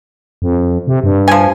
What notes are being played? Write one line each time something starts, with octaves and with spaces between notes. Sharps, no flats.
F2
C3
G2
F3 G#5